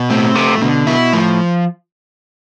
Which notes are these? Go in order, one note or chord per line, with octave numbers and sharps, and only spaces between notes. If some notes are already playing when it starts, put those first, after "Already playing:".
Already playing: B2
A2 C4
C3 A3
A2
B2 D3
B2 E4
A2 F3